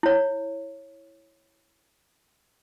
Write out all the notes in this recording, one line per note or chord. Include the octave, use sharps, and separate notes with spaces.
E4 C#5